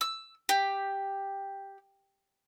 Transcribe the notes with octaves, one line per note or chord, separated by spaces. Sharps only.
E6
G4